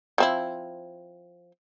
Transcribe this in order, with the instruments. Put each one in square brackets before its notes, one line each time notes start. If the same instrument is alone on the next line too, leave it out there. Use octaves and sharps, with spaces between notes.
[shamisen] F3 C4 E4